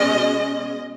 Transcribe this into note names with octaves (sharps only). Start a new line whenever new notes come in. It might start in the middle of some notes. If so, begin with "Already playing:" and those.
Already playing: B2 G#3 C#4 D#5